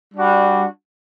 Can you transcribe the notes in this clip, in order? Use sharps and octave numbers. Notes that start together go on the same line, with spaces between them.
G3 D4 F#4